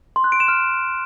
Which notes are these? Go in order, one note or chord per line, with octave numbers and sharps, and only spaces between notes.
C6
F#6
D7
E7
F6